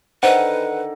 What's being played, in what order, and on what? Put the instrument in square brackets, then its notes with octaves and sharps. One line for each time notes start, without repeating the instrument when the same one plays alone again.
[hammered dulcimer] D3 D#3 [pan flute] B4 [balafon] C5 [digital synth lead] F#5